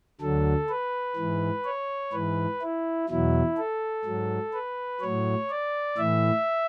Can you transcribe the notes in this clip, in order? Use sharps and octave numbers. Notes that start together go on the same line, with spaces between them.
D2 D3 F#3 A4
B4
G#2 E3
C#5
G#2 E3 B4
E4
E2 B2 F#3 E4
A4
G#2 F#3
B4
A2 F#3 C#5
D5
A2 E3 E5